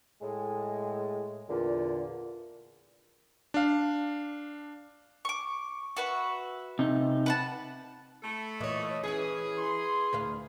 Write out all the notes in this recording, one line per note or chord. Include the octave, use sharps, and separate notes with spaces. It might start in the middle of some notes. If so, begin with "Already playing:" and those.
A2 G#3
E2 A#2 D3
D4 F5
C#6 D6
F#4 B4 E5
C3 D#4
B4 F#5 A5
A3 A4 B5
A#2 E3 C#5 D#5
C#4 E4 G#4 B4
C6
D2 B4 F5